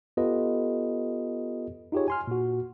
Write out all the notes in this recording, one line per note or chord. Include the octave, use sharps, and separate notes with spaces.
B3 F4 G4 A4 B4 D#5
D#4 F4 G4 G#4 C#5
G#5 C6 F6
A#2 F#4